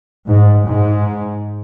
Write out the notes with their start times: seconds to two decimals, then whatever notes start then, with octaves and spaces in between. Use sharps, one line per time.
0.29 G#2
0.67 G#2